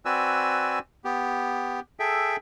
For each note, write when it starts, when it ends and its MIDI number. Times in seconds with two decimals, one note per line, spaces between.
0.05 0.79 60
0.05 0.79 66
0.05 0.79 71
0.05 0.79 74
0.05 0.79 80
0.05 0.79 88
1.05 1.80 59
1.05 1.80 67
2.00 2.36 68
2.00 2.36 69
2.00 2.36 76
2.00 2.36 79